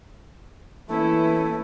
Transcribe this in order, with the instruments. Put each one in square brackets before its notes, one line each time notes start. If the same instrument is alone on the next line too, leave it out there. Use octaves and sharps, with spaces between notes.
[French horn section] E3 [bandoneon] A3 [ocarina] A#3 [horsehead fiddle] C#4 E4